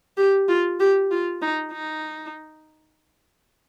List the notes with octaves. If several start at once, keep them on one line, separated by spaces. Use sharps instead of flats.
G4
F4
G4
F4
D#4
D#4